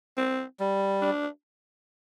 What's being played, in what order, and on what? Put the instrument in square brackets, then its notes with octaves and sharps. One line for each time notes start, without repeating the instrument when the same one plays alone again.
[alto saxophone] C4
[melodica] G3
[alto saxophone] D4